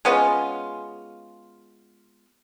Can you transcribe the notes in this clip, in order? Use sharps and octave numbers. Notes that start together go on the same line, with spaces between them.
G#3 B3 C#4 F4